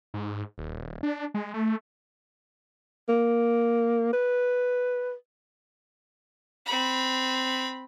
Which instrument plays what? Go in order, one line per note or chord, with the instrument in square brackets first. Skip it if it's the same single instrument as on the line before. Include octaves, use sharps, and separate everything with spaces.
[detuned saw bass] G#2
D#1
D4
G#3
A3
[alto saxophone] A#3
B4
[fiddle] C4 B5